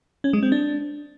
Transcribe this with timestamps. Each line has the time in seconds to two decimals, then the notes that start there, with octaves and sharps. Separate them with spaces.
0.24 C#4
0.33 G#3
0.43 C4
0.52 D4